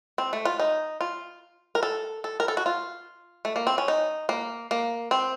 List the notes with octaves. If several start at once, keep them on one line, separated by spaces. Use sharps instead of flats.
C4
A3
F4
D#4
F4
A#4
A4
A4
A#4
A4
F#4
F4
A3
A#3
C4
C#4
D#4
A#3
A#3
C4